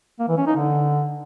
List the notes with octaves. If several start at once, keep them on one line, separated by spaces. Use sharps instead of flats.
A#3
E3
C#4
D#4
D3